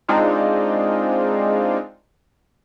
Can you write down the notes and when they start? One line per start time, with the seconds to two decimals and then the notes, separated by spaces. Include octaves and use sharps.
0.08 G#3 C4 D4 D#4 F4